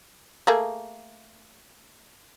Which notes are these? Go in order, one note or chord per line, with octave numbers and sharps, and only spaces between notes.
A3 A#3 G#4